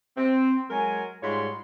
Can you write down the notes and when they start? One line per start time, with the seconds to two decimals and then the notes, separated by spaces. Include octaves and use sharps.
0.18 C4
0.70 F#3 G#3 A#4 C#5 G#5
1.22 G#2 G3 F4 C#5 B5 C6